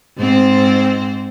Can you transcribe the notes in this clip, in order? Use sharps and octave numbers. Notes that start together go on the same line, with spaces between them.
G#2 C4 C5